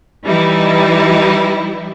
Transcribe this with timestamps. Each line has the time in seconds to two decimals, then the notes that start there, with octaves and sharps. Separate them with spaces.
0.24 E3 G3 D#4 E4